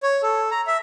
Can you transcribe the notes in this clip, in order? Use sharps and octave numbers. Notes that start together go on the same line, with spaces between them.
C#5
A4
A#5
E5